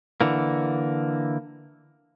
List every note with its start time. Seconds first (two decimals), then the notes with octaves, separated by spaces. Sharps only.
0.21 D3 E3 A#3